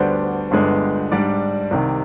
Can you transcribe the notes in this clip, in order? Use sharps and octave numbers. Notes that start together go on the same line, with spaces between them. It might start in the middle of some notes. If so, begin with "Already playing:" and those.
Already playing: D2 D3 G3 B3 D4 C5
G1 G2 D3 G#3 B3
G#2 G3 D4 D5
C2 C3 D#3